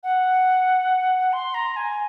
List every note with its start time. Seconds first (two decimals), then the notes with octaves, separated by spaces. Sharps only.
0.03 F#5
1.33 C6
1.54 A#5
1.76 G#5